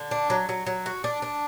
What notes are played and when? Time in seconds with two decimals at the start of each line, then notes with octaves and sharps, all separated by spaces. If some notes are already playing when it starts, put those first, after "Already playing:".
Already playing: D3
0.11 D4
0.30 F#3
0.49 F#3
0.67 F#3
0.86 F#4
1.04 D4
1.22 D4